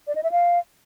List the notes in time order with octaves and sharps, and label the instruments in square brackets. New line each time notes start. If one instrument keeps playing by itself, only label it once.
[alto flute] D5
D#5
E5
F5